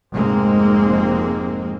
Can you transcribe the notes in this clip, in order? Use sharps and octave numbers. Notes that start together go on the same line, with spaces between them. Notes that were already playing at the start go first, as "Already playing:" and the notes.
F1 G#2 G#3 A#3 C4